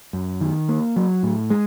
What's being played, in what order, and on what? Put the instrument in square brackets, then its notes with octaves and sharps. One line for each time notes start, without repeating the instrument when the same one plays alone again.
[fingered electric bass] F#2
D#3
A#3
F#3
A2
G#3